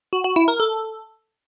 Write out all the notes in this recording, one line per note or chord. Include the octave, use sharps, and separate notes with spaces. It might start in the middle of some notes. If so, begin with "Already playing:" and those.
F#4
F#4
E4
A#4
A4